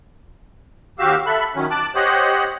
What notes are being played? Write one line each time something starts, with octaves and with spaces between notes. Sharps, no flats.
D#2 F#4 G4 F5 E6
A4 E5 B5 F#6
D#3 F#3 C#4
A5 D6 F#6
G4 C5 C#5 D#5 F#5 F#6